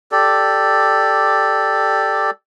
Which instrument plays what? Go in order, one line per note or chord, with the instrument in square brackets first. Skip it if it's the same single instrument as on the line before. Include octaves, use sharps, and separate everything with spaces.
[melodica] G4 A4 D5